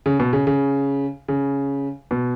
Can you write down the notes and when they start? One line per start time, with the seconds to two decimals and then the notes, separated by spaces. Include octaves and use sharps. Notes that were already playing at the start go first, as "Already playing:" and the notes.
0.06 C#3
0.20 B2
0.33 C#3
0.47 C#3
1.28 C#3
2.11 B2